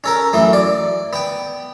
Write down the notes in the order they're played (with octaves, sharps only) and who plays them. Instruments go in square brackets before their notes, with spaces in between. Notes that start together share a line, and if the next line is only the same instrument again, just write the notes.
[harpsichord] C#4 A4 A#4
F#2 E3 A3
D5
B3 G5